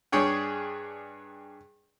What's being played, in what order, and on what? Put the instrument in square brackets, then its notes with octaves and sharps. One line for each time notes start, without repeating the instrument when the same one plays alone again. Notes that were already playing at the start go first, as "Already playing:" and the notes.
[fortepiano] G2 D4 G#4 C#5 G5